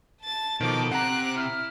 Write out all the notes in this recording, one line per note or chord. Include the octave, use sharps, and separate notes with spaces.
A5 A6
B2 D#3 F3 D#4 A4 D6 D7
C3 F#5 A#5 F#6
E4 F6